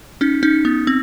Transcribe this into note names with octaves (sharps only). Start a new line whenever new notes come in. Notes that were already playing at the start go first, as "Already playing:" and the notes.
C#4 D#4
C#4 D#4
B3
C4